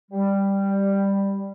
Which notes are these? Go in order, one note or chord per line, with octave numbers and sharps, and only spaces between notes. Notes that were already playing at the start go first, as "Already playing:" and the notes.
G3